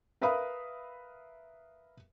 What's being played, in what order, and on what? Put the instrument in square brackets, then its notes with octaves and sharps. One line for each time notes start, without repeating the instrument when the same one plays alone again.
[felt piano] A#4 B4 E5 F5 B5 D#6